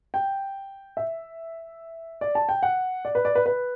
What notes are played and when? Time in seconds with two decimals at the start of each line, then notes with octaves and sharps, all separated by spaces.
0.14 G5
0.97 E5
2.21 D5
2.35 A5
2.49 G5
2.63 F#5
3.05 D5
3.15 B4
3.25 D5
3.35 B4
3.46 B4